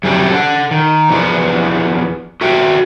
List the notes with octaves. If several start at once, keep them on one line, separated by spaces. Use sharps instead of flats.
F#2 C#3 G3 A3 C4 D4
A4 F#5
D#3
E2 E3 F3 B3 D4
F#4 A4 E5 G5